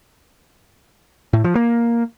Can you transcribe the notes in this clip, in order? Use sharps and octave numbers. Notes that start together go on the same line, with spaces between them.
A2
F3
A#3